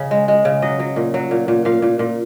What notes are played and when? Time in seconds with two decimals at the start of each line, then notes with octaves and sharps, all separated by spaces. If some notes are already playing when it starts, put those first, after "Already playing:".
Already playing: C#3 D#5
0.11 G#3
0.28 G#3
0.45 C#3
0.62 F#3 D#5
0.79 F#3
0.96 A#2
1.14 F#3
1.31 A#2
1.48 A#2
1.65 A#2 F5
1.82 A#2
1.99 A#2